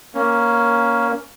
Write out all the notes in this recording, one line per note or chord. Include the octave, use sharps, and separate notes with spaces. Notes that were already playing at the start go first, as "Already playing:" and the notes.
A#3 C#4